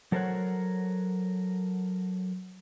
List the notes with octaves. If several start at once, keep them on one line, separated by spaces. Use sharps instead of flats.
F#3 A4 A#4 C5 C#5 F#5